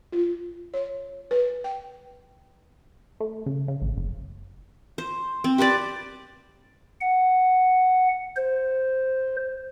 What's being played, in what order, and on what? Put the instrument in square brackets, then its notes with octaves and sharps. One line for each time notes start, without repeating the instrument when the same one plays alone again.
[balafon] F4
C#5
B4
G5
[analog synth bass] A3
C#3
C#3
A1
F#1
[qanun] C5
C4
G4 B4 C5 D5
[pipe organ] F#5
C5